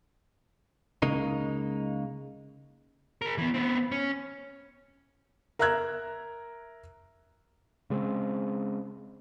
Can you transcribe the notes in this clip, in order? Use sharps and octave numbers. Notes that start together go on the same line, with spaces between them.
C#2 C#3 G#3 A#3 D#4
G#4 A#4
E3 B3
B3 C4
C#4
A#4 E5 A#5 E6 F#6 G#6
C#3 G#3 B3 C4